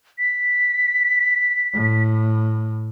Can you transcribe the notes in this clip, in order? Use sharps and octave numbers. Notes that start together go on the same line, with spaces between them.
B6
A2